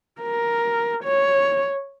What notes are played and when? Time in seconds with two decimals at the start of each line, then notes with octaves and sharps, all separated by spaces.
0.21 A#4
1.04 C#5